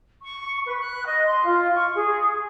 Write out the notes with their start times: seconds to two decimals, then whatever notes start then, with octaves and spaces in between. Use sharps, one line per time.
0.23 C#6
0.65 B4
0.80 F#6
1.04 D#5
1.24 C6
1.43 F4
1.73 C#6
1.93 G#4